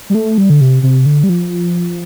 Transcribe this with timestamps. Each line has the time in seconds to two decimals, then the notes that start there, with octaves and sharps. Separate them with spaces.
0.10 G3
0.15 A3
0.38 G3
0.50 D3
0.61 C3
0.83 C3
1.06 D3
1.23 G3
1.29 F3